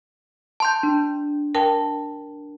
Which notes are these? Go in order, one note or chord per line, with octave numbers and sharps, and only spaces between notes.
A5 C6 G6
D4
A#4 G5 A5